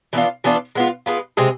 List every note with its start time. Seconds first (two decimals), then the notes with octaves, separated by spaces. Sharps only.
0.13 E3 B3 D4 F4
0.44 E3 B3 D4 F4
0.75 G#3 B3 F4
1.06 G#3 B3 F4
1.37 C3 G#3 C4 G#4